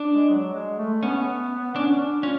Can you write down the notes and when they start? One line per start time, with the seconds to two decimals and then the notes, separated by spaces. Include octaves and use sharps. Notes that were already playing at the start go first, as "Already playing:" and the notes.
Already playing: D4
0.11 G#3
0.29 F#3
0.53 G#3
0.78 A3
1.03 B3 C#4
1.75 C#4 D4
2.00 D4
2.23 C#4 F4